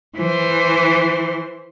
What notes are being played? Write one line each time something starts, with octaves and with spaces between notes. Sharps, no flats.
E3 C5